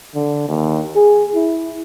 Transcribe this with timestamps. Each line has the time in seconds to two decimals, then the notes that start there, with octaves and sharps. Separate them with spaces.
0.15 D3
0.48 D#2
0.96 G#4
1.35 E4